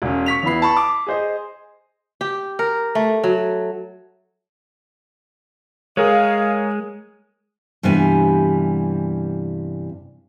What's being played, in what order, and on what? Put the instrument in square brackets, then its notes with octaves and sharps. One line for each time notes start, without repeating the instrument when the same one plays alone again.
[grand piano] E1 C#4
C#6 B6 F7
E2 B3 E4 B5 C7
A5 B5 C#6
D6
G#4 C5 D#5
[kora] G4
A#4
A3
F#3
[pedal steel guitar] G#3 [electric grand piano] G#4 A#4 C#5 [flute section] F5
[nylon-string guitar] G2 C3 E3 G3 B3 G#5